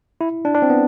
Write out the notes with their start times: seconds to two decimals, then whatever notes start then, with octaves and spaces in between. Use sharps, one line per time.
0.21 E4
0.45 D4
0.55 D4
0.62 C4
0.70 B3